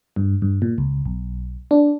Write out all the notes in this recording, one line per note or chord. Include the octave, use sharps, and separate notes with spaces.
G2
G2
A#2
C#2
B1
D4